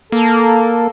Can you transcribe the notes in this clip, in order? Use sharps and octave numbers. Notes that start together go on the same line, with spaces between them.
A#3 A4